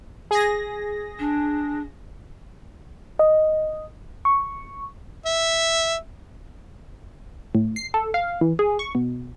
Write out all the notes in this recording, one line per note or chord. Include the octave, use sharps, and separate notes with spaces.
G#4 A#6
D4
D#5
C#6
E5
A2
C7
A4
F5
E3
G#4
C#6
B2